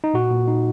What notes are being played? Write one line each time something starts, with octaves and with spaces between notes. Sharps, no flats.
D#4
A#2 F#4
A#2
D#4